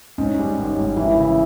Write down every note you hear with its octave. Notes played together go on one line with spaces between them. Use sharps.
G#2 C#4
G3
G#1
G#1
E3 E4
C#3